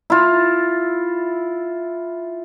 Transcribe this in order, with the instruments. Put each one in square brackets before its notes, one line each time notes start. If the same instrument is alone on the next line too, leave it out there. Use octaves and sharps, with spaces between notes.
[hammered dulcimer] E4 F4